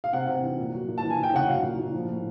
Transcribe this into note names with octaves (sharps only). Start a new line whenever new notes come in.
F5
C3 F#5
C3
E3
A#2
F#3
A#2
A5
E3
G#5
E3
G5
C#3 F#5
F#3 F5
A#2
A#2
F3
A2